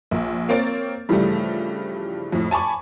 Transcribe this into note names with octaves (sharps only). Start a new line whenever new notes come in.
A#1
A#3 C4 C#5 A6 D7
G2 C#3 E3 F3 G3 A3
F2 A2
G#5 A5 B5 C#6 D6